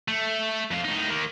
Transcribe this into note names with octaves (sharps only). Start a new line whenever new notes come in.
A3
F2 F4
A2 D#4
D#3 A#3